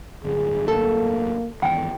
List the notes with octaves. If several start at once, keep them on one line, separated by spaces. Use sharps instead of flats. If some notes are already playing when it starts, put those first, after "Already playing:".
D1 G1 G#4
A#3 A4
G#1 E2 G5 G#5